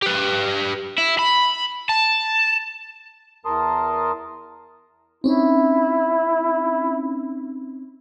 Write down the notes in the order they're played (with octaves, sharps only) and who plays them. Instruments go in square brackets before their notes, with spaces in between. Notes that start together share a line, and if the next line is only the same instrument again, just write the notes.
[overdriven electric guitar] G4 B4
E4
B5
A5
[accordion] E2 A#4 A5 C6 D#6
[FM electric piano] C4 C#4 D#4 [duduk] E4